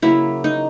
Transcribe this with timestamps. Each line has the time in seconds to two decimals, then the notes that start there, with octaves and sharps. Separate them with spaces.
0.02 C#3 F#3 A#3 E4
0.44 D#4